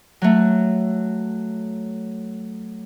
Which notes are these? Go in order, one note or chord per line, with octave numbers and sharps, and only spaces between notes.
F#3 A3